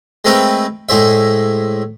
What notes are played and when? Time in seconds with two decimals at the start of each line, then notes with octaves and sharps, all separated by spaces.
0.25 G#3 A3 C4 A#4 B4 G5
0.89 A2 G#3 C5 E5